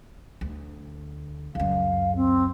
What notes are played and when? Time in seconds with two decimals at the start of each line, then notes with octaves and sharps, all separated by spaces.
0.41 D2
1.55 C#2 F#2 F5
2.16 C4